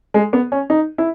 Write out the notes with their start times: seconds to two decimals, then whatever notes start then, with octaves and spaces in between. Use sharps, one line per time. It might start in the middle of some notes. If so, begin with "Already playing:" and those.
0.14 G#3
0.33 B3
0.52 C#4
0.70 D#4
0.98 E4